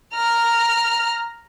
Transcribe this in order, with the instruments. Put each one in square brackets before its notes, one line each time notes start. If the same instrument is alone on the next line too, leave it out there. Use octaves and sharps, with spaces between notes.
[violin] A#5 F6